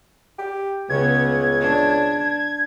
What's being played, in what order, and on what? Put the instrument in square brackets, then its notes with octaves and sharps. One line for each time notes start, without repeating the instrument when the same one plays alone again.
[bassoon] G4
[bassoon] C#2 [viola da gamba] C#3 B3 [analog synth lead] G#6
[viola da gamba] D4